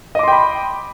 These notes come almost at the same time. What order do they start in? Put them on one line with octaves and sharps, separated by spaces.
D#5 D6 C6 G5 B5